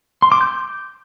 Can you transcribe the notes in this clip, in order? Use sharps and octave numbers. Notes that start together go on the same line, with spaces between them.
C6
D6
G6